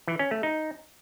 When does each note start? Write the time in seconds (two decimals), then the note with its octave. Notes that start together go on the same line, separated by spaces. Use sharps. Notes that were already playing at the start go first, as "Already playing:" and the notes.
0.08 E3
0.19 C#4
0.31 A3
0.43 D#4